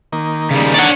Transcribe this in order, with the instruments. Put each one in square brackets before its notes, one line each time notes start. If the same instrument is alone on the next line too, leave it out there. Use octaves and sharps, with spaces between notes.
[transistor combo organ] D#3 A#3
[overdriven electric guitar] C#3 G3
[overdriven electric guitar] D4 C#5 [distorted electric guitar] D5 F#5